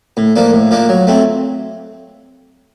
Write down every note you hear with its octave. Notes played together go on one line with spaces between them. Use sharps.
A2
F3 A#3 D4
A2
F3 A#3 D4
F#3
A3 C4